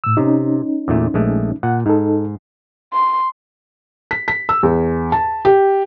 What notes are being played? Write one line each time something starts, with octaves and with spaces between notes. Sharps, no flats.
A2 E6
C3 C#4 D#4
E2 A#2 A3
A#1 G#3 A3
A#2 F#5
G#2 D#4 A4
C6
B6
B6
E6
E2
A5
G4